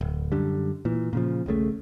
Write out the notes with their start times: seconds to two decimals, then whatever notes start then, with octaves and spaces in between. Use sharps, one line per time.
0.01 D1
0.32 F#2 D3 G3
0.85 A#2 E3
1.13 A#2 C#3 F3
1.46 D#1 A#1 C#3 A3